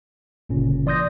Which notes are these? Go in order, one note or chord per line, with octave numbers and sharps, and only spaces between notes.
G1 A#2 C#3 C#4
E3 D5 C6 D#6 G6 A#6